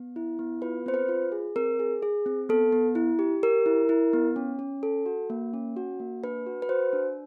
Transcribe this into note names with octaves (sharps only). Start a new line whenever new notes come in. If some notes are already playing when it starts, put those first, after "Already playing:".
Already playing: B3
E4
B3
F4 B4
C4 C5
B4
F4
G#4
C4 A#4
G#4
G#4
C4
B3 A4
B3
E4
G4
G4 A#4
E4
E4
B3
C#4
C#4
A4
F#4
A#3
C#4
F#4
A#3
D4 B4
F#4
B4
F#4 C5
D4